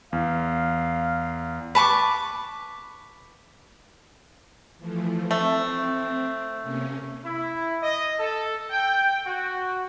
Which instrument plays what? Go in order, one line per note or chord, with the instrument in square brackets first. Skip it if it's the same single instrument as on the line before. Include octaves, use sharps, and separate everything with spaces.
[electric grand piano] E2 [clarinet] F5
[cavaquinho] B4 A5 C#6 D6
[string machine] E3 F3 A3
[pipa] A3 [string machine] C4
[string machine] C3 A#3 C#4
[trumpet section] E4
D#5
A4
G5
F#4